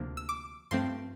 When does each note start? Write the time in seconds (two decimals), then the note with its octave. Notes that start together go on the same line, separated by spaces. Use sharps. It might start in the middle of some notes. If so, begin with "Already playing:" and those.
Already playing: D2 C3 F3 A#3 D4
0.17 E6
0.29 D6
0.71 G2 F3 A3 C4 C6